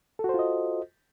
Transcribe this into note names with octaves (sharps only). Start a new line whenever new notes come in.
F4 F#4 A4 C5 D#5